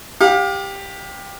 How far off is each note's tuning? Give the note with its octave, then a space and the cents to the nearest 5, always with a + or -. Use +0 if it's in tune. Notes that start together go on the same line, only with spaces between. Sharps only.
G4 +10 F5 +35